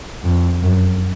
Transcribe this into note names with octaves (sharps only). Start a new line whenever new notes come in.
F2
F#2